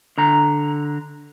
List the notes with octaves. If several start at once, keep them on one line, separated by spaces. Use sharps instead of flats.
D3 A#5